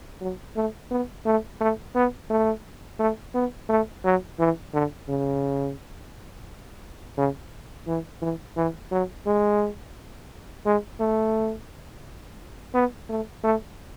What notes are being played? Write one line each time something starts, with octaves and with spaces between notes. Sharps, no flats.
F#3
A3
B3
A3
A3
B3
A3
A3
B3
A3
F#3
E3
D3
C#3
C#3
E3
E3
E3
F#3
G#3
G#3
A3
B3
A3
A3